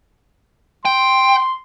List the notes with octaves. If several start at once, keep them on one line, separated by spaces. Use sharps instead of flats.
G5 C6